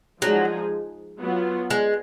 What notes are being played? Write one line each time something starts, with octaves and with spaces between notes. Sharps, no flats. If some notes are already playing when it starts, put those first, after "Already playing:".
F3 F#3 G#3 D#4 G#4
F#3 B3 F4
G#3